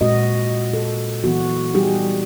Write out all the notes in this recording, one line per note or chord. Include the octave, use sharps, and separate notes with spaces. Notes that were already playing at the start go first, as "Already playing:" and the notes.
A#2 G#3 C4 F#4 D#5
A4
E3 B3 F#4
G3 D#4 G4 G#4